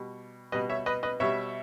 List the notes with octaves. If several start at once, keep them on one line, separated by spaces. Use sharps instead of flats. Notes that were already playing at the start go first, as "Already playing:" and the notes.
Already playing: B2 G3
B2 G3 B4 D#5
C#5 E5
B4 D#5
B4 D#5
B2 G3 C#5 E5